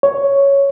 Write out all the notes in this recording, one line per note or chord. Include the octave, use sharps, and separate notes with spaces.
C#5